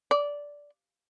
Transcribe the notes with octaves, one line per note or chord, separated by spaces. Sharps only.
D5